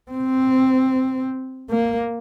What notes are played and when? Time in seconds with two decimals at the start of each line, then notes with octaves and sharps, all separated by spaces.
0.11 C4
1.70 A#3